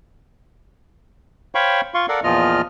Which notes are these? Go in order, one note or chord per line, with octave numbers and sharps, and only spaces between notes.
C5 C#5 F5 G5 B5 C#6
F4 F5 C6 C#6
A4 A#4 D5 F5 F#5
E2 A#2 F3 F4 D#5 F6